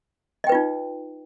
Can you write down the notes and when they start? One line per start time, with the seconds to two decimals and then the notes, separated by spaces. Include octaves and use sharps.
0.44 D#5
0.47 G5
0.49 B4
0.52 F4
0.55 D#4